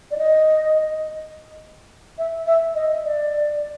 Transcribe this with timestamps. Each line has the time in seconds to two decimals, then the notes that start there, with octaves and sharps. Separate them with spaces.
0.11 D5
0.18 D#5
2.18 E5
2.47 E5
2.75 D#5
3.04 D5